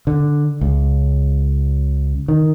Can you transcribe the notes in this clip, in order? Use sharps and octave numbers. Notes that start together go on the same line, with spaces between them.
D3
C#2
D#3